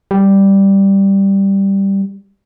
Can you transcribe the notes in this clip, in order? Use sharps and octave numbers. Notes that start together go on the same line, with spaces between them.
G3